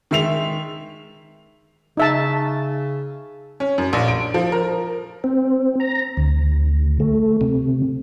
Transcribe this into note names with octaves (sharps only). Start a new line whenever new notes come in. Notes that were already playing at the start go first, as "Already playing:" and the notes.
D#3 G#3 E5 C7 F7
C#3 D#4 E5 A5
C#4
F#2
A#1
D7
F3
A#4
C4
A#5
D2
A3
C3